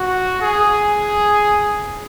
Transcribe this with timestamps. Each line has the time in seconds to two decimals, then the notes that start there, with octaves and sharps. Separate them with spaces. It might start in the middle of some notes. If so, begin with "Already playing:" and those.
Already playing: F#4
0.42 G#4